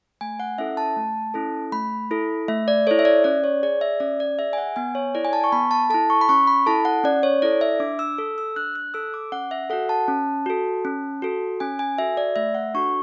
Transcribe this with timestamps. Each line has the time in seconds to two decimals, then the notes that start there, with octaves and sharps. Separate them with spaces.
0.21 A3 G#5
0.40 F#5
0.58 C#4 E4 A4 E5
0.77 A5
0.97 A3
1.34 C#4 E4 A4
1.72 A3 B5
2.11 E4 A4
2.48 A3 E5
2.68 D5
2.87 E4 A4 C#5
2.99 E5
3.05 D5
3.24 C#4 D5
3.44 C#5
3.63 G#4 D5
3.81 E5
4.00 C#4 D5
4.20 D5
4.39 G#4 E5
4.53 G#5
4.58 F#5
4.76 B3 G#5
4.95 C#5
5.15 E4 A4 D5
5.25 G#5
5.33 A5
5.44 C#6
5.52 B3 B5
5.71 A5
5.90 E4 A4 A5
6.10 C#6
6.21 B5
6.29 C#4 C#6
6.47 B5
6.66 E4 A4 A5
6.85 F#5
7.04 C#4 D5
7.23 C#5
7.42 E4 A4 D5
7.61 E5
7.80 D4 D6
7.99 E6
8.18 A4
8.38 E6
8.56 D4 F#6
8.76 F#6
8.94 A4 E6
9.14 D6
9.32 C#4 F#5
9.51 E5
9.70 F#4 A4 F#5
9.89 A5
10.08 C#4
10.46 F#4 A4
10.85 C#4
11.22 F#4 A4
11.60 C#4 G#5
11.79 G#5
11.98 F#4 A4 E5
12.17 D5
12.36 A3 E5
12.55 F#5
12.74 D4 F#4 A4 C#6